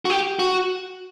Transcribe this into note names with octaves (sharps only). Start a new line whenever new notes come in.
F#4
G4
F#4